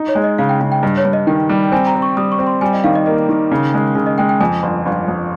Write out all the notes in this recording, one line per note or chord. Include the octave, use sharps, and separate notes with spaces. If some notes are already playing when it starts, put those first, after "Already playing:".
Already playing: D#4
C#5
G#3
D#5
C#3 F5
G5
C#3
G5
G2 D#5
C#5
G2
D#5
D#3 G5
G3
C4 G#5
A#5
C4
C#6
G3 D#6
C#6
C4
C6
G3 G#5
D#5
D#3 F5
D#5
A#3 D#5
D#3
C#3
G#3
C#3
D#5
G#3 G5
G5
F2 G#5
G1
G1
F2